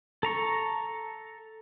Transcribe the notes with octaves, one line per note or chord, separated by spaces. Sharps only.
A4 A#5 C#6